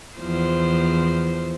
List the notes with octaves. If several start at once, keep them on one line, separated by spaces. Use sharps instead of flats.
E2 F3 C5